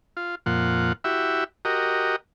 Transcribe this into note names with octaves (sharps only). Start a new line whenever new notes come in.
F4
F2 A#2 F4 F#5
E4 F#4 G4 E5
F#4 G4 A#4 D#5